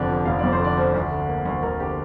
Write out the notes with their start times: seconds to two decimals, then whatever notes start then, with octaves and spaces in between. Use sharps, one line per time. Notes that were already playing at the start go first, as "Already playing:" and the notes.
Already playing: F1 F2 D3 G4 D5
0.08 F3
0.25 F1 F5
0.39 F2 D5
0.52 C5
0.60 D3 D5
0.77 F3
0.94 D2
1.11 D3
1.29 A#3
1.46 D2
1.63 D2 A#4
1.80 D3 G4